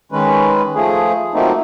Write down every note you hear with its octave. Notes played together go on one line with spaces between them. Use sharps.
D#3 G#3 C#4 B4
F3 A3 G#4
F3 F#3 A3 A#3 C4 D#4